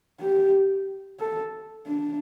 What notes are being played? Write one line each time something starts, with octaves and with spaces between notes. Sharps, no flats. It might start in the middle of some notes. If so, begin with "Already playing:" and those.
G4
A4
D4